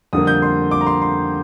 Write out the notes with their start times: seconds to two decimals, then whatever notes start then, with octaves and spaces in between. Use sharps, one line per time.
0.13 F2 D3 G3 A#3 D#6
0.27 G6
0.42 C6
0.71 D6
0.81 A#5
0.87 C6
1.02 C6